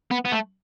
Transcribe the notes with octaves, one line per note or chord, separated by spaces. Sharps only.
B3
B3
A3